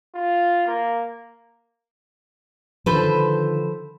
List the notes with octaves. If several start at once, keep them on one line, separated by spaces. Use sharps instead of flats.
F4
A#3
D3 D#3 F3 A4 B4 C5